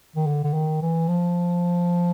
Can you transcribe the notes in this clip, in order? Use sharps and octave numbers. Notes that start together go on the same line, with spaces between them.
D#3
D3
D3
D#3
E3
F3